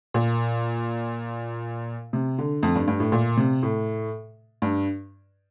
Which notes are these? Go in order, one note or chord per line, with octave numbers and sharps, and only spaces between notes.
A#2
C3
D3
F2
G2
G2
A2
A#2
C3
A2
G2